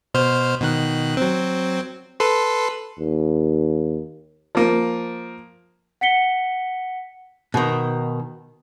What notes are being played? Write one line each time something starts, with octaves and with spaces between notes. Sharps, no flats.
B2 C5 F6
B2 D#3 F#6
F#3 C4
A4 B4 C6
D#2
F3 A#3
F#5 B6 C#7 G7
B2 D#3